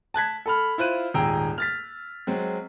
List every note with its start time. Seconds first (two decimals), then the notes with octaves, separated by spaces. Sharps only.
0.14 A5 F#6 G#6 B6
0.46 A4 B5 F6
0.78 E4 F4 C5 F#6 D#7
1.14 D#1 G#2 G#4 G5 A#5 E6
1.58 F6 A6 B6
2.27 F#3 G#3 C4